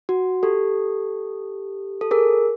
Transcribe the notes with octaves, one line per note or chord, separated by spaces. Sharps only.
F#4
G4 A4
A4
G#4 A#4